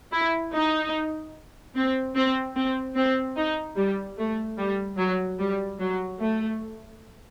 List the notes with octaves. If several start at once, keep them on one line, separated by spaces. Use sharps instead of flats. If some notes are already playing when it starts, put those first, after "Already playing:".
E4
D#4
C4
C4
C4
C4
D#4
G3
A3
G3
F#3
G3
F#3
A3